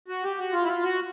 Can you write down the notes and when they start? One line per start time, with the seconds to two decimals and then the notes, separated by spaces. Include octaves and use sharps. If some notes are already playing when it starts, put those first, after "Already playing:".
0.08 F#4
0.24 G4
0.38 F#4
0.53 F4
0.64 E4
0.68 F4
0.84 F#4